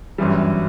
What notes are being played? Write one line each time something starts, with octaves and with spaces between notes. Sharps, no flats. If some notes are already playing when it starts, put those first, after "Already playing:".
G1 F#2 E3 G3